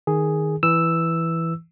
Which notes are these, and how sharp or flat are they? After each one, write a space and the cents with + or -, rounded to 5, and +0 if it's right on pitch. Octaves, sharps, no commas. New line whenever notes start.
D#3 +0 G#4 +0
E3 +0 E6 +0